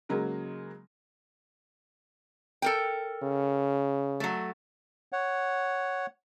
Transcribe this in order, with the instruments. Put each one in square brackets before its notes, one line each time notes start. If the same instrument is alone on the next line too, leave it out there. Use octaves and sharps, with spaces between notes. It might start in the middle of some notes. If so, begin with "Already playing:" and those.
[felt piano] C#3 F#3 G#3 A#3
[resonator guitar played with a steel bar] A4 A#4 G5
[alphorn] C#3
[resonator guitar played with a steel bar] F#3 A3
[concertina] C#5 F#5